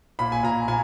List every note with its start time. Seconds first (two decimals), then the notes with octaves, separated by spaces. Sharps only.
0.19 A#2 B5
0.32 G#5
0.43 A#2 A#5
0.68 A#2 G#5